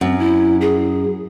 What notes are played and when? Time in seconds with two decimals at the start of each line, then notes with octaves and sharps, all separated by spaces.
0.01 F#2 C4
0.19 E4
0.61 G#4